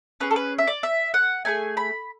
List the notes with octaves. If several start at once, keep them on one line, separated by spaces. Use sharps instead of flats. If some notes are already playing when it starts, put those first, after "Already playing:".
C#4 G#4 B4
A4
B4
E5
D5
E5
F#5
A3 D4 G#4 G#5
B5